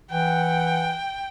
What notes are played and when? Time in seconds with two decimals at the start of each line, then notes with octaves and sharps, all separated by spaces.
0.11 E3 F#5 G5